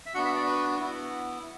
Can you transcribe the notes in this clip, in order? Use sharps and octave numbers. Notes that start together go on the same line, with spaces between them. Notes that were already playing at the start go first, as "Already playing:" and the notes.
E5
B3 D4 F#4 F#5
E5
D5
B4
B3 E4